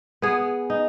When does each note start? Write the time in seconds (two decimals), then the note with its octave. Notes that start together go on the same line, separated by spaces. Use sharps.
0.22 B3 G#4
0.70 D#4